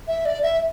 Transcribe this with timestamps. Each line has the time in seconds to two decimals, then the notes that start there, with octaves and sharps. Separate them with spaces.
0.08 E5
0.25 D5
0.43 E5